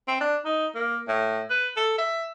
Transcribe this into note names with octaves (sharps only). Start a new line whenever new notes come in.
C4
D4
D#4
A#3
A2
B4
A4
E5